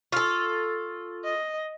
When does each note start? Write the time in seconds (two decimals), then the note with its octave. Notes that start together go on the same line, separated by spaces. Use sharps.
0.12 F4 A4 C#6 F6
1.24 D#5